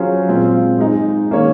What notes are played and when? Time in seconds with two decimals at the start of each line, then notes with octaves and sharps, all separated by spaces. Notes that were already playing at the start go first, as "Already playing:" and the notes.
Already playing: F#3 C#4 F4 G#4 C5
0.28 A#2 G#3 C4 F4
0.79 G#3 D#4 G#4
1.31 D#3 A#3 C#4 G#4 C#5